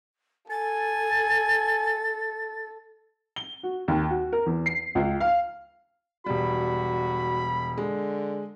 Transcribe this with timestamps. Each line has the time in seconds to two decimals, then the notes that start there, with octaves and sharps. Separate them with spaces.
0.50 A4 G#5 A6
3.36 G7
3.63 F#4
3.88 D#2
4.10 F#4
4.33 A#4
4.46 E2
4.66 C7
4.95 C#2
5.20 F5
6.26 E1 G3 F#4 B5
7.78 D3 G#3